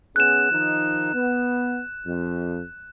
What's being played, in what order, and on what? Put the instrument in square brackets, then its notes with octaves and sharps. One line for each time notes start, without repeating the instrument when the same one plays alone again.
[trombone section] B3 C#4 G#4 [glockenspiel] F#6 E7
[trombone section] D#3 F3 D#4
B3
F2